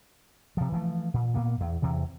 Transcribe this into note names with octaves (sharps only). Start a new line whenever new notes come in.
C3 F3
E3 F3 A3
A#2
A#2 A#3 B3
E2
E2 C3 E3